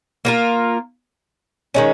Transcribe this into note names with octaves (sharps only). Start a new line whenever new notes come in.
A#3 F4 A#4
D#3 G#3 C#4